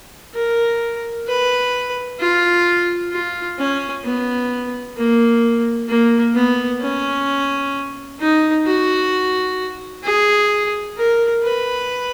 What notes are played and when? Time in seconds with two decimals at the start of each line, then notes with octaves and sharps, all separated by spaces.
0.34 A#4
1.27 B4
2.19 F4
3.12 F4
3.58 C#4
4.05 B3
4.97 A#3
5.89 A#3
6.35 B3
6.81 C#4
8.20 D#4
8.66 F#4
10.04 G#4
10.97 A#4
11.43 B4